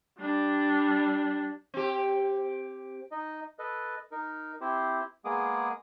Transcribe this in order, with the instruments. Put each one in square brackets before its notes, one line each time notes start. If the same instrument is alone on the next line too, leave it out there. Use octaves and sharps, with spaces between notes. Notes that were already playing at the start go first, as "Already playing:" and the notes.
[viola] G3 D4
[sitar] C4 G4
[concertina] D#4 D#5
A4 B4 D#5
D#4 A#4
C4 E4 G4 C5
G#3 A#3 B3 G#4 D6 D#6